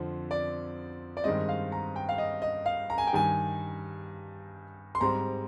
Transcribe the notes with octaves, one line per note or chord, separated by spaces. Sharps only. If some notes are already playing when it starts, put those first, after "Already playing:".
Already playing: F2 D3 F3 C4
D5
D5
G2 D#3 G#3 C4 D#5
F5
A#5
G5
F5
D#5
D#5
F5
A#5
G#5
G5
G2 D#3 G3 G#5
C6
G#2 G3 C4 A#5